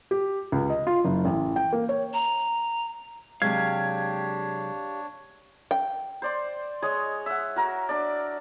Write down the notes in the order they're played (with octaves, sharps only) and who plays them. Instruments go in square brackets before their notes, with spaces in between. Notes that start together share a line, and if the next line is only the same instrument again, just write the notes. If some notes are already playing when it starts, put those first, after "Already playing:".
[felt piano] G4
C#2
D#5
F4
F#1
A1
G5
A#3
C#5
[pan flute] A#5
[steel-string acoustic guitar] C3 F#3 G#3 [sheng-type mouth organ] D4 C#5 [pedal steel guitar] G4 F5 [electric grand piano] G#6
[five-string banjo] G5
[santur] C5 D5 C6
G#3 C#5 D#5
E5 F#5
F#4 A#4
D4 D5